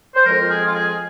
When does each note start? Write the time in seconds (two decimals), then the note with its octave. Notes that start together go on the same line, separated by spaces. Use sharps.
0.15 C5
0.25 F2 F3 G#3 A#4
0.39 F4
0.50 G#4
0.66 F4
0.74 G#4